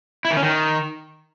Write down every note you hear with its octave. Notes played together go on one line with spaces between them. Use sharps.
E4
D#3
C#4
D#3